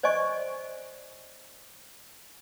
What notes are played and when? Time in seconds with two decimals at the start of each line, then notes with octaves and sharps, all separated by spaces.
0.03 C5 D5 D#5 G#5 C#6